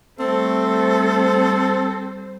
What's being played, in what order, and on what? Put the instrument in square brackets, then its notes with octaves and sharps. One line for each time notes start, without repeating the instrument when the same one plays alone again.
[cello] G3 C5 [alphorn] A3 [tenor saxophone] C4 [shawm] A4